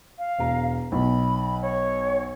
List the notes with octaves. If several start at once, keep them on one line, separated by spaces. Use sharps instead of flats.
F5
E1 A#5
B1 B5
C#5